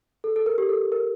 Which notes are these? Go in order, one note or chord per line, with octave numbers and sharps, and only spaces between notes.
A4
A4
A#4
G4
A4
A#4